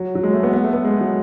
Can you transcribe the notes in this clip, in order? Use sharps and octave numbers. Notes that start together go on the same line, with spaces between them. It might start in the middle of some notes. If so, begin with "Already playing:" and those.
Already playing: F#3
F#3
G#3
A3
B3
B3
A3
B3
G#3
F#3